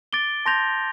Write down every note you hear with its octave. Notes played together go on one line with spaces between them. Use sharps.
D6 A6 D7 G7
A5 C6 G6 A#6 F7